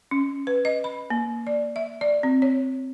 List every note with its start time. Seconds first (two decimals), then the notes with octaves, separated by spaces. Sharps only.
0.11 C#4
0.47 B4
0.65 D#5
0.84 B5
1.10 A#3
1.47 D5
1.76 E5
2.01 D5
2.23 C4
2.42 C#5